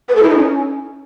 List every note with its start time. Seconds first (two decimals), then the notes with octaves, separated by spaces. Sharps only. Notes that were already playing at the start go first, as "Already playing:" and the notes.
0.09 B4
0.16 A4
0.23 E4
0.30 D#4
0.37 C#4